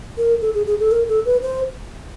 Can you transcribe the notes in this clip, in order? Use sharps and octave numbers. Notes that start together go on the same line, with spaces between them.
A#4
A4
G#4
G#4
A4
A#4
A4
B4
C5